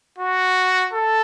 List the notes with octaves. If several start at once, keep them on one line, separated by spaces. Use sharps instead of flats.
F#4
A4